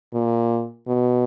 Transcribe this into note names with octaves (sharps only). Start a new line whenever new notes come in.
A#2
B2